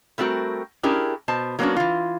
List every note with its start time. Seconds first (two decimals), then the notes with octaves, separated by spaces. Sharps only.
0.18 G3 A3 C4 F#4 A#4
0.83 C#4 D4 E4 G4 G#4 A#4
1.28 B2 C5 A5
1.59 F#3 A#3 B3 C#4 D4 F#4
1.76 E3 F4